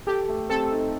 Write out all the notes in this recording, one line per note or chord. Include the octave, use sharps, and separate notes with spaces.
G4 A4
A3
C4 A4
D#4